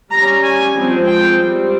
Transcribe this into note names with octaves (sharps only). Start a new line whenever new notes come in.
G3 C#4 A#5
G#5
F3 G#3 C4
G5
G3 C4